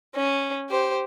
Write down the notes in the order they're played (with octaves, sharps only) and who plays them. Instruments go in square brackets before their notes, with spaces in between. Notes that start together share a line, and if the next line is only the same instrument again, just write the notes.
[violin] C#4
G4 C5